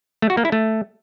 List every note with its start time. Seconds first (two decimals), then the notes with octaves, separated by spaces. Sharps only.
0.22 A3
0.30 F#4
0.37 A#3
0.45 E4
0.52 A3